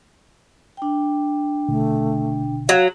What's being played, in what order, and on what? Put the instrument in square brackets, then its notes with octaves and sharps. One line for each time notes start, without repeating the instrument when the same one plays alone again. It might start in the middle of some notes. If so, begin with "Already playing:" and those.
[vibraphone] D4 G5
[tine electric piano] G1 B2 D3 [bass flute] A3
[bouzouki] F#3 [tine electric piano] F#4 [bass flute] F5